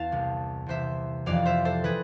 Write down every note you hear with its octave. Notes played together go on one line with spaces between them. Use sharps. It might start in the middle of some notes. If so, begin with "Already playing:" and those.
Already playing: E2 F5 A5
C2 C3 E3
C2 C3 E3 C5 E5
F1 F2 E3 D5 F5
C5 E5
A4 C5
E3 G#4 B4